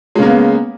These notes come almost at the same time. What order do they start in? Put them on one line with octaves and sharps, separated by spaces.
G#3 C#3 A#3 B3